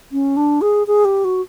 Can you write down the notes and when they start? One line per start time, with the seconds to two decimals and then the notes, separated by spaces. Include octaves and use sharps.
0.12 C#4
0.36 D4
0.61 G#4
0.87 G#4
1.05 G4
1.24 F#4